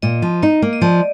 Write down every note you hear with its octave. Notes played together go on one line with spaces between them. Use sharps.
A#2 D#5
F3
D#4 D#5
A#3
D#5
F3 D5